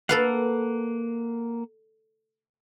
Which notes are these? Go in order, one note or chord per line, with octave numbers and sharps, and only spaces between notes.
A#3 A4 B4 F5 F#5